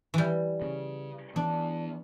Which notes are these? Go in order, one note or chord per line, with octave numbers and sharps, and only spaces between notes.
E3 G3
C#3
E3 B3 D4